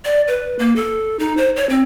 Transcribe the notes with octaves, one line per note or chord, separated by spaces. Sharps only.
D5
B4
A#3
A4
D#4
C5
C#5
C4